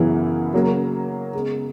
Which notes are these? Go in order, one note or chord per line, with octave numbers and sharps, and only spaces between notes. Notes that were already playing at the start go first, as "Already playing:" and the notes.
Already playing: F#2 C#3 E3 B3 E4
C#3 F#3 A#3
C#3 G#3 B3